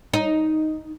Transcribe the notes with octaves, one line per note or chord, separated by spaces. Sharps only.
D#4